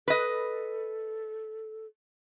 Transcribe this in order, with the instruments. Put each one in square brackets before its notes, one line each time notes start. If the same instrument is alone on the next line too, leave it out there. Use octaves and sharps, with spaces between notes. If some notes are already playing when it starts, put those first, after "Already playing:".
[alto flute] A4 [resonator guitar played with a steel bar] B4 D#5